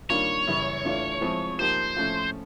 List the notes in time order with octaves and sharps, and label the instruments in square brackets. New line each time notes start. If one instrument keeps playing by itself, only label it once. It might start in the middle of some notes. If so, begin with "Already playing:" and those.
[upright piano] D#3 G3 A#3 D4 F4 [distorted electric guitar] C#5
[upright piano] F#2 C#3 E3 G3
E3 A3 D4 F4
F3 G#3 C4 E4
[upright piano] F3 A#3 D#4 G4 [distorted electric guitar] C5
[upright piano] A2 F3 A3 C#4 F4